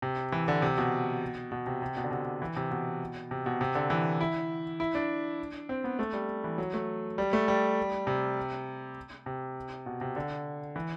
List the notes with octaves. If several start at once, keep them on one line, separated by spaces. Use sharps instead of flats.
C3
E3
D3
C3
B2
B2
C3
C3
B2
D3
C3
E3
C3
B2
C3
B2
C3
D3
E3
E4
E4
D4
C4
B3
A3
G3
E3
F#3
A3
G3
A3
G3
C3
C3
B2
C3
D3
E3